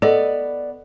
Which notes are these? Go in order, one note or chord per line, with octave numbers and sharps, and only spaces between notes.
B3 A4 D5 D#5